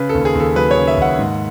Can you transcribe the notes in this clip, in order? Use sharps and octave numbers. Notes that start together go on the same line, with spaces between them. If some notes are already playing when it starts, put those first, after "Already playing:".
Already playing: C#3 B4
A4
D#2
G#4
D#2 A4
F#3 B4
C#5
C#3
E5
D#2 F#5
G#2